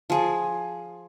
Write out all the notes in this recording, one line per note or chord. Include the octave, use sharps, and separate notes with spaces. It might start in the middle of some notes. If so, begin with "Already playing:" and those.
F3 G#4